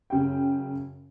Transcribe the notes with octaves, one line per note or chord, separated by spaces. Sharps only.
F#2 C#3 G5